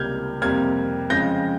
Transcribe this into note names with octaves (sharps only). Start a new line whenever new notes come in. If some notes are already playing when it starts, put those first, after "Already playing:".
Already playing: C#2 C3 G3 A#3 F6 G6 G#6
F2 C3 G3 A#3 F6 G#6
F2 C#3 F3 G#3 G6 A#6